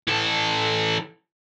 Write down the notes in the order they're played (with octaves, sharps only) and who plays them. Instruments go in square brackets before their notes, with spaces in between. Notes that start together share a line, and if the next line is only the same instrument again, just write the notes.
[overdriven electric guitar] E3 A4